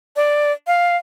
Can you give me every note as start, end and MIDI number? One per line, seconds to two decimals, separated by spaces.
0.16 0.52 74
0.67 0.97 77